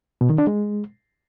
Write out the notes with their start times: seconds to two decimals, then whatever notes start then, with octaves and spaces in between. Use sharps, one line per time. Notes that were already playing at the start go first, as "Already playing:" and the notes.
0.21 B2
0.30 D#3
0.38 D4
0.47 G#3